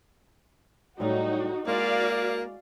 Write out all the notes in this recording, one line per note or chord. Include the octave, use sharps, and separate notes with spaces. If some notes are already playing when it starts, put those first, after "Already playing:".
A2 F#3 G3 D#4 F#4
G#3 A#3 E4 F#4 D5 F5